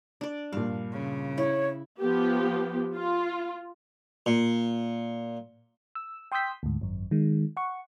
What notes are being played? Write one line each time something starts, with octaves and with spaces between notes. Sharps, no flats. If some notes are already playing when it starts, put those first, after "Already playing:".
D4 D5
G2 A#2 F5
C#3
E4 C#5
F3 B3 G4
F4
A#2
E6
G5 C6 D#6 E6 G6 B6
D2 G#2
G#1 F#2
D#3 G#3
F#5 C#6